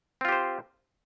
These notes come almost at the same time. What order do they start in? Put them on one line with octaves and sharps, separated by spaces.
C4 F4 G4 C5